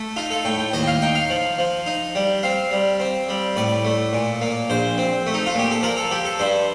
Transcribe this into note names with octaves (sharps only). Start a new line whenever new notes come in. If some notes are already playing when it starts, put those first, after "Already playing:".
Already playing: A3
D#4 F4
A4
A2 G5
G5
D#2 D#5
G5
F5
D#4 G5
F5
F3
F3
D#4
G3
C4 F5
G3
C4
G3
A2 D5
A3
A#2
A#3
A#1 C5
C4
A3
D#4
F4
A#2 G4
A4
F3 A#4
A4
F3 G4
A4
G2 C5